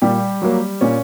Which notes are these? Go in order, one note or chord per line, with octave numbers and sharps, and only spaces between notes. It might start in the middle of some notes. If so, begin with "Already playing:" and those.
A#2 G3 G4
F#3 A#3
A#2 C#4